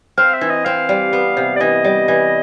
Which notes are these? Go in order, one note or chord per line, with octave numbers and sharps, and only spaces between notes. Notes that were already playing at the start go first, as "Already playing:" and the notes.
C4 F5
E5
E3
D#5
C4 F5
G3
B3
C3
D5
E3 D#5
G3
E3